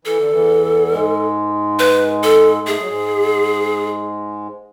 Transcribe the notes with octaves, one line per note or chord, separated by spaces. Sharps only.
E3 A4
D3
E2 E3
G#2 G#3
B4
A4
A3 G#4
G#3
F#3
G#2 G#3